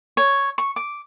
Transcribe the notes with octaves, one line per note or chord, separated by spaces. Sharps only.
C#5
C#6
D6